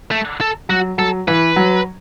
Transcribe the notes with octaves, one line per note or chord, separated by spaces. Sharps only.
A3
A4
F#3 F#4
F#3 A4
E3 B4
F#3